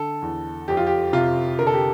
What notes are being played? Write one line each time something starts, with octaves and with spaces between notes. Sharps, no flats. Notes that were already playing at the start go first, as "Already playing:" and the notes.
Already playing: D3 A4
E2
F2 G4
F4
G4
C3 F4
D3 A#4
A4
G4